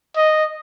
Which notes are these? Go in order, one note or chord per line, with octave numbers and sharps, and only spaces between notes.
D#5